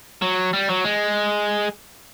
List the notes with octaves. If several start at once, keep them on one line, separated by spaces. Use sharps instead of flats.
F#3
G3
F#3
G#3